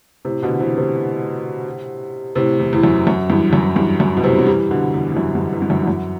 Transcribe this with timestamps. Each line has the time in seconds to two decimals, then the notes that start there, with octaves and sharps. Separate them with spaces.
0.25 A2 C3
0.42 B2 D3
0.60 C3 E3
0.77 A2 C3
2.35 A2 C3
2.60 E2
2.73 E2
2.84 F#2
3.07 F#2
3.30 E2 G2
3.53 F#2
3.76 E2 G2
4.00 F#2
4.17 B2
4.24 A2 C3
4.39 F#3
4.46 E3 G3
4.71 B2 D3
4.94 E2
5.12 E2
5.17 F#2
5.35 E2 G2
5.53 E2
5.62 G2
5.70 F#2
5.81 E2
5.88 F#2